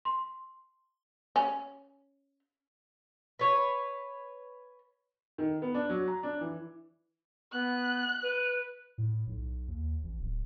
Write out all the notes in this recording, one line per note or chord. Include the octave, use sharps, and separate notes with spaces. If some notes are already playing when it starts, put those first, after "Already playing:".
C6
C#4
B4 C#5
D#3
B3
D4
F#3
A#5
D4
E3
B3 F#6
B4
A2
B1
D#2
A1
D1